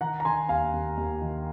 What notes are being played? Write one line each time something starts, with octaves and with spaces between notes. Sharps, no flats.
D#3 F#5 A#5
A#5
D#3 G#5 C6
D#2 F5 G#5
D#2
D#2
D#3